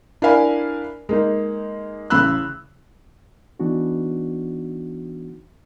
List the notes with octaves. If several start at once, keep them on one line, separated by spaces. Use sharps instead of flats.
D4 E4 A#4 F5 G#5 B5
G#3 A#3 D#4
A1 C#3 B5 E6 F#6
E3 B3 D4 D#4 F#4